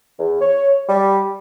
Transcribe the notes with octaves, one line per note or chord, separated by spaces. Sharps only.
E2
C#5
G3